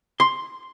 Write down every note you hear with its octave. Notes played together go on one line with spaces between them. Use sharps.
C6